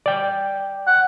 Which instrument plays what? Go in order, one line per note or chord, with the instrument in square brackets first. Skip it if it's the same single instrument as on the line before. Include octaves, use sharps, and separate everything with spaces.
[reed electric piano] D5 G5
[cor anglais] F#5